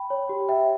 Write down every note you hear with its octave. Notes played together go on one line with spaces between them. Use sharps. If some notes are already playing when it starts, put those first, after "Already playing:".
Already playing: G5 B5
C#5
G4
G4 E5 G5